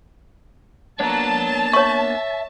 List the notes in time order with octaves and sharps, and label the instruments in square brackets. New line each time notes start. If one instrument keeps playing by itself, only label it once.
[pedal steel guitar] A#3 B3 D4 [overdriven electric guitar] C#5 A#5 [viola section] A5
[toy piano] C#5 C#6 [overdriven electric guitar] E5